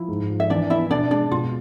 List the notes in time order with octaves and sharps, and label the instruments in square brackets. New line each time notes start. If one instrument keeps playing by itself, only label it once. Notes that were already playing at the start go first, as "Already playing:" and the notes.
Already playing: [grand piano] F3 [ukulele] E4
[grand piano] G#2
F3
[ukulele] E5
[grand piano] E3 [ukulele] D4 D5
[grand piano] B3 [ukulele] E4 E5
[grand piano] B2 [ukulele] D4 D5
[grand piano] G#3 [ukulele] D4 D5
[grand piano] B2 [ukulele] F4